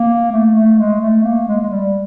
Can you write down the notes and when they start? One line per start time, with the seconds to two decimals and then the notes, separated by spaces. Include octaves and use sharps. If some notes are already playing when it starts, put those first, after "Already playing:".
Already playing: A#3
0.32 A3
0.55 A3
0.79 G#3
1.01 A3
1.24 A#3
1.48 G#3
1.60 G#3
1.70 G3